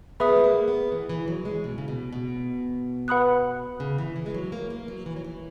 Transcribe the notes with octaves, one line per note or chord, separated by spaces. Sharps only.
B3 G#4 B4 E5 B5 D#6
F#3
G#3
A#3
B3
E3
E3
F#3
G#3
B2
C#3
B2
B2
B4 F#5 B5 D#6 F#6
C#3
E3
E3
G#3
F#3
A#3
A#3
F#3
E3
F#3
E3